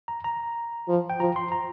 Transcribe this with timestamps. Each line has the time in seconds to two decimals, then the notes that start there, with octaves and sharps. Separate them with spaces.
0.08 A#5
0.24 A#5
0.89 F3
1.10 G5
1.20 F3 A#5
1.36 C6
1.52 A#5